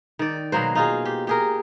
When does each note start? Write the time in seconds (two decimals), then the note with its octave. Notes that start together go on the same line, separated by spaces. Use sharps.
0.19 D#3 D5
0.52 B2 F#3 A#3 C5
0.75 D#4 F4 G#4
1.05 G4
1.27 G4 G#4 A#4